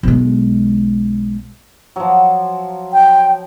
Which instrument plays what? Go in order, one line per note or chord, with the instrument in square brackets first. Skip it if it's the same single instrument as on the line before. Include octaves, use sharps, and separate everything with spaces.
[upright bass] B1 G#3
[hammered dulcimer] F3 F#3
[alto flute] G5